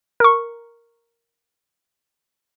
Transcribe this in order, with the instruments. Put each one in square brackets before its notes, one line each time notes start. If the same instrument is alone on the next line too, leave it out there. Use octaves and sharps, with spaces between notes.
[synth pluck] A#4 C#6